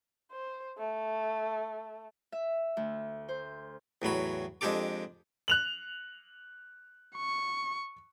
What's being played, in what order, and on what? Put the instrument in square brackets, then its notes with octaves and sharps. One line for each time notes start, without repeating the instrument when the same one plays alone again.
[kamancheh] C5
A3
[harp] E5
D2
C5
[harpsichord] E2 A2 F#3 B5
F2 G#3 D4 G4 A4 D6
[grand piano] F#6 F7 F#7
[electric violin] C#6